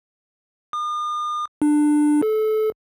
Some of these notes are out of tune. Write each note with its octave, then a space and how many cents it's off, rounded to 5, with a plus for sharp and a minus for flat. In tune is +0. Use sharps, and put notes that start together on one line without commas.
D#6 -45
D4 +20
A4 -25